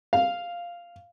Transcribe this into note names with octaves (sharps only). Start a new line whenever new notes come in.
F5